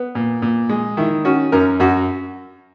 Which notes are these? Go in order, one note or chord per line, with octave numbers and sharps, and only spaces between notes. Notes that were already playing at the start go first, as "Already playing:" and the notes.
Already playing: B3
A#2
A#2
G#3
D#3 E4
C#4 F#4
F#2 A#4
F#2 F#4